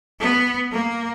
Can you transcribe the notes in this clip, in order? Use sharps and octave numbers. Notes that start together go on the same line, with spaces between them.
B3
A#3